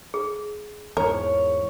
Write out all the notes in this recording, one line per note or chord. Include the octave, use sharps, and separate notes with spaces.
G#4
E2 G#2 A#4 C#5